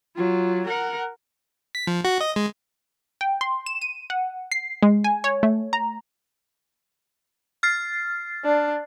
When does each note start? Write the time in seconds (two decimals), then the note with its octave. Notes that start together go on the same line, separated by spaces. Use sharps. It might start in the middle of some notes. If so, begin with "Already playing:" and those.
0.16 F#3 F4
0.67 A#4 F#5
1.75 B6
1.87 F3
2.05 F#4
2.21 D#5
2.36 G#3
3.21 G5
3.41 C6
3.66 E7
3.82 D#7
4.10 F#5
4.52 C7
4.83 G#3
5.04 G#5
5.24 C#5
5.43 A3
5.73 A#5
7.63 F6 A6 C7
8.45 D4